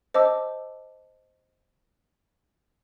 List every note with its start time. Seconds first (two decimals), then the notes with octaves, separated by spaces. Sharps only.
0.14 C5 D#5 A5 D6 E6